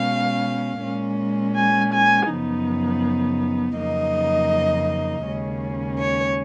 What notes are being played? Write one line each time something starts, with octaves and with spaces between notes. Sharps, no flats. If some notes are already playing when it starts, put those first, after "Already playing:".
Already playing: B2 G#3 C#4 F5
A#2 G#3 C#4
G#5
G#5
F#2 C#3 F3 B3 D#4
F2 C#3 F#3 A#3 D#4 D#5
D#2 C#3 G#3 C#4
C#5